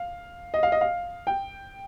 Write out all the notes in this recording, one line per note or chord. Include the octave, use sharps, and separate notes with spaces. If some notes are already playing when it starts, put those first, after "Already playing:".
Already playing: F5
D#5
F5
D#5
F5
G5